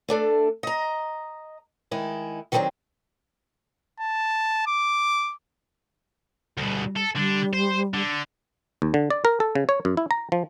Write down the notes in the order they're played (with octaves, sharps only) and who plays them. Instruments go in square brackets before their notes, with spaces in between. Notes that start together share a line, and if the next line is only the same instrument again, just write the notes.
[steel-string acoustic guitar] A3 D4 A4
D#5 A#5
D#3 G#3 E4
D#3 F#3 G3 B3 C4 D4
[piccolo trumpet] A5
D6
[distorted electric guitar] D2 B2 [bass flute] G3
[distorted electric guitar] A4
[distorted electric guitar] D3 D4 [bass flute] G3
[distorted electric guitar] C5
D3
[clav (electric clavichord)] D#2
D3
D5
A#4
A4
C#3
C#5
F#2
E4
A#5
F3